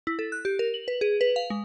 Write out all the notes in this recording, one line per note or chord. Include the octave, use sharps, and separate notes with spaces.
E4
A4
F#6
G4
A#4
F#7
B4
G#4
B4
F5
G#3